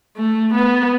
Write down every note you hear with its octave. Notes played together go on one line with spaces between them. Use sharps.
A3
B3